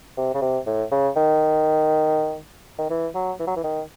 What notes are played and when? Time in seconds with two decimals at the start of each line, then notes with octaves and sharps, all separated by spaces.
0.17 C3
0.34 C#3
0.42 C3
0.66 A2
0.92 C#3
1.16 D#3
2.78 D#3
2.90 E3
3.15 F#3
3.40 E3
3.47 F#3
3.56 E3
3.64 D#3